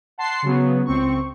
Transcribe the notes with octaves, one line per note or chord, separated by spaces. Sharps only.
F#5 A5 C6 C7
C#3 F#3 B3
C#2 C4 C#6